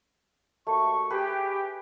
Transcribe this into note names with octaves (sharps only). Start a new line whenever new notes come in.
D#2 A3 F#4 C#6
G4 G#4 B4